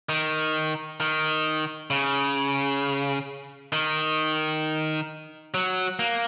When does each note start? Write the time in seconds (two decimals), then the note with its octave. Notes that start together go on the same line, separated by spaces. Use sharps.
0.09 D#3
1.00 D#3
1.90 C#3
3.73 D#3
5.54 F#3
5.99 A#3